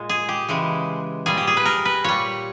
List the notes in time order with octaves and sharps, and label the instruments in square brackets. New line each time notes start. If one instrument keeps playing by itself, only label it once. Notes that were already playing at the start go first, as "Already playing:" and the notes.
Already playing: [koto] A#2 G#3
G#4
G4
C#3 E3 G#3
A#2 G3 G#4
G4
G#4
B4
A#4
B4
A#2 G3 C#5